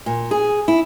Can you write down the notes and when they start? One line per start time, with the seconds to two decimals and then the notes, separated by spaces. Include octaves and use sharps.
0.06 A#2
0.31 G#4
0.68 E4